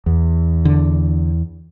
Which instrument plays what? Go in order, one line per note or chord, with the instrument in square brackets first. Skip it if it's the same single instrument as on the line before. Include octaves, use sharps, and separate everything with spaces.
[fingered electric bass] E2
[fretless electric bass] D3